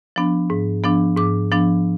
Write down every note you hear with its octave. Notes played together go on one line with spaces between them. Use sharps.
F3 B3 D4
G#2
F3 B3 D4
G#2 D6
F3 B3 D4